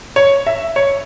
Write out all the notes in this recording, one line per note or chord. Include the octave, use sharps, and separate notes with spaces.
C#5
E5
C#5